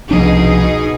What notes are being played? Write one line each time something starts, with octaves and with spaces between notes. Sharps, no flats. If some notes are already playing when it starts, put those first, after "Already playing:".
C2 B2 F3 D4 D#4 G#4